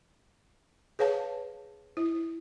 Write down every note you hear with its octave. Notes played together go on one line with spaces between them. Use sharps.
G#4 B4 C#5 F5 A5
E4